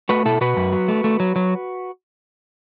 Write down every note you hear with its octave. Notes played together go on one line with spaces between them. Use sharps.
A3 F#4 B4
B2 E4 A4
B2 F#4 B4
F#2
F#3
A3
A3
F#3
F#3